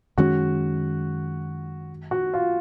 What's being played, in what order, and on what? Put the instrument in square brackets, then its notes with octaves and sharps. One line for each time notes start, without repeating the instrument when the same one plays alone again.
[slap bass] F#2 D#3 G#3 C#4 [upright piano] F#4
[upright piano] F#4
F4